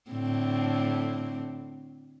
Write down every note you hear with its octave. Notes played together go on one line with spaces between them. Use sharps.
A2 D3 C4